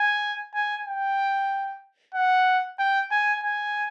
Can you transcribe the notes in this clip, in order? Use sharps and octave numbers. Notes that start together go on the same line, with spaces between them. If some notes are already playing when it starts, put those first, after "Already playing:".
Already playing: G#5
G#5
G5
F#5
G5
G#5
G#5